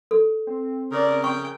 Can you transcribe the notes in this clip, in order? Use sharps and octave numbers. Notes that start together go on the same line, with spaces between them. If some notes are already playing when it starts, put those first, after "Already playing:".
A4
C4
C#3 A#4 D5
G5 C#6